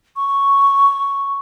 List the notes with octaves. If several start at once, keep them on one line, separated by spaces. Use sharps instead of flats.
C#6